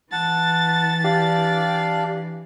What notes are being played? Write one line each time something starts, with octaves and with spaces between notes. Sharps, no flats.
E3 F#5 A5 A6
D4 G4 D5 F5